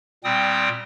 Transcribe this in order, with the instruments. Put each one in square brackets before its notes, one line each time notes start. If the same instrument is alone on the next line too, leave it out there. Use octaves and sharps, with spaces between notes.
[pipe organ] A#2 G3 C4 G5 D#6